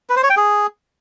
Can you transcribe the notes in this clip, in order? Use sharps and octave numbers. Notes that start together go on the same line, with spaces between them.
B4
C5
C#5
G5
G#4